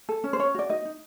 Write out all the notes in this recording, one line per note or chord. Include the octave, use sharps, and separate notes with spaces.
A4
C#4
C5
C#4 C#5
F#4 D5
D#4 D#5
D#4